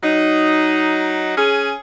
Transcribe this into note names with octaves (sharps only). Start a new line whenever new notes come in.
F#3 D#4
C#4 G#4